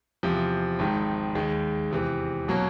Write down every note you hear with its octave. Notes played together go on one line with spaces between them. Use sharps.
E2 C3 F3
G#1 G#2 D#3
D#2 D#3 G#3
E2 C3 E3
B2 F#3 A#3 C#4